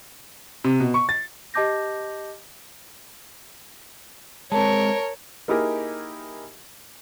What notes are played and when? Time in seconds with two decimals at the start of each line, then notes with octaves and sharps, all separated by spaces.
0.64 C3
0.80 B2
0.94 C#6
1.09 A6
1.54 G4 D#5 A5 D6 G6 A#6
4.52 G#3 C4 A#4 C#5 A5
5.48 A#3 D#4 E4 G4 G#4 A#4